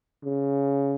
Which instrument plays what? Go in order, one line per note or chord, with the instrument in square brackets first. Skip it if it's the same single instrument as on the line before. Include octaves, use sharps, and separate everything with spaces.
[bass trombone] C#3